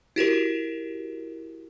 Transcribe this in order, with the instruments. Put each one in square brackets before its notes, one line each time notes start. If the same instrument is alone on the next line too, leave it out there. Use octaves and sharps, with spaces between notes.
[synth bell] E4 F#4 G4 A#4